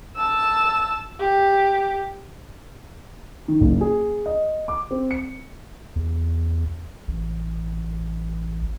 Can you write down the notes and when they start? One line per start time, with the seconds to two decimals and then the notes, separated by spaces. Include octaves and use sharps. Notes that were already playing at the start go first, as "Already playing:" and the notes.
0.16 A5 E6
1.20 G4
3.48 D#3
3.61 F#1
3.81 G#4
4.26 D#5
4.68 D6
4.91 C4
5.11 C#7
5.96 E2
7.08 A1